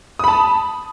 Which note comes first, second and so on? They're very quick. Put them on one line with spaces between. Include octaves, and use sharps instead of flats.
D#6 B5 A5